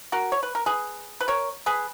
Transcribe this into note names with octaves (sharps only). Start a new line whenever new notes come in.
F#4 A#4
C#5
B4
A#4
G#4 B4
B4
A#4 C#5
G#4 B4